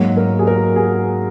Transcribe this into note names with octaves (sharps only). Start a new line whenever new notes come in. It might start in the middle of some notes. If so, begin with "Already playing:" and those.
Already playing: G#2 F#3 A#3 F#4
A#4
G#4
A#4
G#4